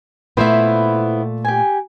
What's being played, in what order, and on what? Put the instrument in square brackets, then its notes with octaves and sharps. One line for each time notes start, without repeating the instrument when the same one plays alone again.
[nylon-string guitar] A#2 A3 E5 [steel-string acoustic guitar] B3 E4 C5
[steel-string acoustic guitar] G4 G#5